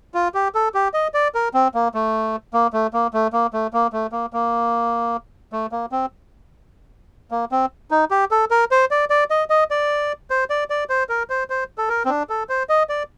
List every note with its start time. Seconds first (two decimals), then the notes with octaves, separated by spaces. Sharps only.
0.14 F4
0.34 G4
0.55 A4
0.74 G4
0.94 D#5
1.14 D5
1.35 A#4
1.54 C4
1.74 A#3
1.94 A3
2.53 A#3
2.73 A3
2.93 A#3
3.14 A3
3.33 A#3
3.53 A3
3.73 A#3
3.93 A3
4.12 A#3
4.33 A#3
5.53 A3
5.72 A#3
5.92 C4
7.31 A#3
7.52 C4
7.91 D#4
8.11 G4
8.31 A4
8.51 A#4
8.71 C5
8.91 D5
9.10 D5
9.30 D#5
9.50 D#5
9.71 D5
10.30 C5
10.50 D5
10.70 D5
10.90 C5
11.09 A#4
11.30 C5
11.50 C5
11.78 A4
11.89 A#4
12.05 C4
12.09 D4
12.29 A4
12.49 C5
12.69 D#5
12.89 D5